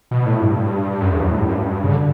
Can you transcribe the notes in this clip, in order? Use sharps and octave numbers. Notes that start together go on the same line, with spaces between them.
B2
A2
G2
F#2
E2
F#2
A2
G2
F#2
G2
C#3
D3